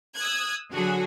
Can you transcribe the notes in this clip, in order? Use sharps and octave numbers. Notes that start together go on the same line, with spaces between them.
D#6 E6 F#6 G#6
D3 F#3 F#4 G#4 A4